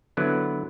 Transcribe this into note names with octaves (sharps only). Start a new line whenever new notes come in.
D3 F#3 B3 E4 B4